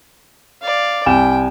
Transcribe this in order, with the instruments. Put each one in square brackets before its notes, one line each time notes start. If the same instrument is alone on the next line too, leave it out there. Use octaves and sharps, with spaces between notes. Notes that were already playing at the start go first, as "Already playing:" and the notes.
[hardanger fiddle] D5 F5
[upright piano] C2 G#5 E7 [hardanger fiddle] G5